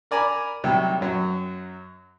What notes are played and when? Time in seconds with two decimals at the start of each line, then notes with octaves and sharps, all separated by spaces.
0.11 A#4 D5 G#5 A#5 B5
0.64 C3 D#3 F#3 G3 C4
1.01 F#2 F#3